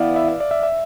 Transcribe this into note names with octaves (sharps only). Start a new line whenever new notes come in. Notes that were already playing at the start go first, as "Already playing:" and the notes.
Already playing: E3 B3 E4 D5 F5
E5
E5
D5
E5
E5